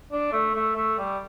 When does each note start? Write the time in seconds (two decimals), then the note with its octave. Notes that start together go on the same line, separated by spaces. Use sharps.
0.12 D4
0.32 A3
0.55 A3
0.76 A3
0.98 G3